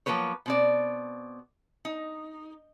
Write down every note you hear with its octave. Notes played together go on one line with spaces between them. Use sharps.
F3 F#3 A#3 B4 C#5
B2 C4 D5
D#4